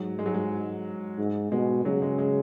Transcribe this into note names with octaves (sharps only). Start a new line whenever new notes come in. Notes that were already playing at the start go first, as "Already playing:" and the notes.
Already playing: G#2 F#3
G#3
F#3
G#3
G#2
B2 G#3
C#3 F#3
G#3
G#3